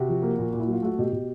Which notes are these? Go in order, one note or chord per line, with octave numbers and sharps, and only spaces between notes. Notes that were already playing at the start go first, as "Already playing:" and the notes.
Already playing: C3 F#4
F3
A#3
A#2
A#2
E4
F#3 F4
A3 F#4
B2 G4
B2